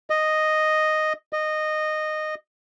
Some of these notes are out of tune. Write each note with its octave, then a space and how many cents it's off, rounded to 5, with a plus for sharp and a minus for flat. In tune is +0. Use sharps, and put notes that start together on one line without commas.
D#5 -5
D#5 -15